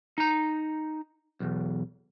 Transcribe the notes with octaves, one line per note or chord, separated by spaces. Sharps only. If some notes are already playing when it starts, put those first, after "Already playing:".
D#4 A#5
B1 E2